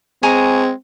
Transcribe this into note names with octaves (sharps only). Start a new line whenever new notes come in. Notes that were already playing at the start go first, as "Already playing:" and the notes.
G#3 C4 G#5 A#5 C#6